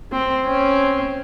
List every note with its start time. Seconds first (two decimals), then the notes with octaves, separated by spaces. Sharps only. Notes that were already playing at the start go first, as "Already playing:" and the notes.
0.12 C4
0.44 C4 C#4